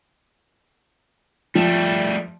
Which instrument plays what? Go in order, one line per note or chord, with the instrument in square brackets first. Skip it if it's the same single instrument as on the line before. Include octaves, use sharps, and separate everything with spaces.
[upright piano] F3 [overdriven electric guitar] G3 A3